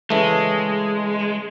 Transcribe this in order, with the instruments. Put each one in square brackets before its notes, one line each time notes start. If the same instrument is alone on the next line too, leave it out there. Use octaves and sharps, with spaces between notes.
[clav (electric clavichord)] C#3 E3 A3 [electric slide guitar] G#3